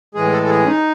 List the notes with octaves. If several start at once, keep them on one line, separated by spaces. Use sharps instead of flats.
A2 E3 G#3 G#4
A4
A4
G#4
C#4
D#4